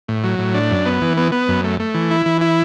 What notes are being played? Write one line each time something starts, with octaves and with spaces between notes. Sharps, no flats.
A2
F#3
A2
D4
F#2
B3
E3
B3
B3
F#2
A3
A3
E3
E4
E3
E4